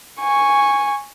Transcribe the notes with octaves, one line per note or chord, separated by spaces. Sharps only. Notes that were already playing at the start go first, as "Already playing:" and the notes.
G#5 C#6